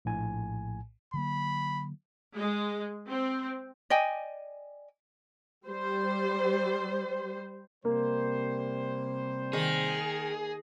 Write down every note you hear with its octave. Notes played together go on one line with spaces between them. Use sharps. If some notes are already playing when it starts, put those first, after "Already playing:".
A#1 A2 G#5
D3 F#3 A#3 B5
G#3
C4
D5 D#5 G5 G#5
G3 C5
C3 G3 A#3 C5
D#3 G#4